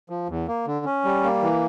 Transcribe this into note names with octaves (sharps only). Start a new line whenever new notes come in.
F3
E2
A#3
D3
C#4
G3
A#3
E3